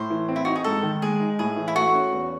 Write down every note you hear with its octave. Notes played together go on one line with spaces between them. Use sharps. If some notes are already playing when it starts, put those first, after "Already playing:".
Already playing: A2 C5
E3
C4
E4
D#4 F#4
G#4
G#2 A4
D#3
G#3 G#4
D#4
A2 G#4
E3
E4
A3 F#4
C#4
E2